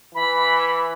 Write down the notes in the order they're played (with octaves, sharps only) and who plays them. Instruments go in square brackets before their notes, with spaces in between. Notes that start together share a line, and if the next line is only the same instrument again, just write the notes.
[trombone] E3 [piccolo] B5